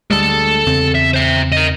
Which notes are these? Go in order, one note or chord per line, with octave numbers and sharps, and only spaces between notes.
D2 G3 G#3 A4 A5
E2 C#3 C4
E5
C5 E5
A#4 D#5